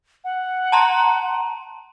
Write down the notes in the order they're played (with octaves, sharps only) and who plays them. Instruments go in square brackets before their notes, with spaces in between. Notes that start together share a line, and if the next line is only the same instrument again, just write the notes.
[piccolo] F#5
[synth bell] A5 A#5 C6